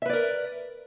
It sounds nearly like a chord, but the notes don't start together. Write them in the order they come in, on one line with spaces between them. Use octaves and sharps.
E5 B4 D5 A#4